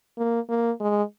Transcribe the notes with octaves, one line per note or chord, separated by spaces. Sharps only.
A#3
A#3
G#3